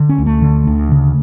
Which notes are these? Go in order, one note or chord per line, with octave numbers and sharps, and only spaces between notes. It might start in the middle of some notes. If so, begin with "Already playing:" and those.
Already playing: D3
C#4
D2
A3
D3
D2
C#3